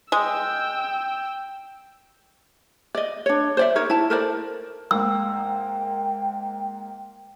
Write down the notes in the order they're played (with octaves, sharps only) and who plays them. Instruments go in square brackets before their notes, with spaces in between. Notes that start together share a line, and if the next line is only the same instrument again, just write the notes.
[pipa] G#3 [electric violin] G5 E6
[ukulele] D5 D#5
D4 C#5
C5 D5 E5
D#4 A#4 C#5
E4 A5
A4 A#4 C5 D5
[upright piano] G#2 A#3 [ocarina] G5 [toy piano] E6